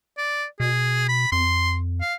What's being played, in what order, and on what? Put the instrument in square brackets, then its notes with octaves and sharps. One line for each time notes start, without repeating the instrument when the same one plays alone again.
[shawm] D5
[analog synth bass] B2 [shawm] G#4
[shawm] B5
[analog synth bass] F2 [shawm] C6
[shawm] F5